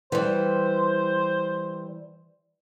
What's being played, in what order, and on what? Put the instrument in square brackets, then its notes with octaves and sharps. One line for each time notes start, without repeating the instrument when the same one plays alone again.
[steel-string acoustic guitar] E3 G3 [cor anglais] C5